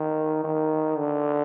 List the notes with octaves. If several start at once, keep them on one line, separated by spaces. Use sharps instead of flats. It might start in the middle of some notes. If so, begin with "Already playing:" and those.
Already playing: D#3
D#3
D3